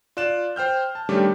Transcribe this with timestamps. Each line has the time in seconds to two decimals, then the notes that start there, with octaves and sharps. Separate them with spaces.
0.17 F4 D5 F#6 E7
0.56 C5 G5 F6 G6
0.95 A5
1.09 D#3 G3 A3 C#4 D4 G4